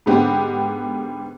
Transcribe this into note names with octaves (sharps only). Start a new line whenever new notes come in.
G#2 D3 G#3 B3 C4 G4